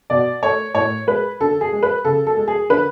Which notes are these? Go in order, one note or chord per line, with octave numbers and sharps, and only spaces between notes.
B2 D5
A3 C#5
A2 C#5
G#3 B4
D3 A4
G#4
G#3
B4
C#3 A4
A4
G#3
G#4
D3 B4